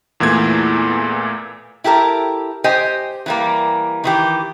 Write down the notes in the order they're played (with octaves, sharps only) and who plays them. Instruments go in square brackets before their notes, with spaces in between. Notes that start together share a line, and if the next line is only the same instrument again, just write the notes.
[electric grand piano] E2 A#2 E3 A3 G#6
[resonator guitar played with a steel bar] E4 G4 A4 A#4
G4 C5 D#5 G#5
E3 G3 A#3
D#3 E3 G4